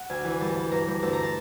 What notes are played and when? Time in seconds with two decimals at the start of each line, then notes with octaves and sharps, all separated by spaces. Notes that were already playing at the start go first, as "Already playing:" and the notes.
Already playing: F#5
0.10 D2 G#5
0.24 E3
0.41 G2 A5
0.55 G2 A5
0.71 G2 A#5
0.87 G2
1.03 D2 A5
1.13 A#5
1.23 A5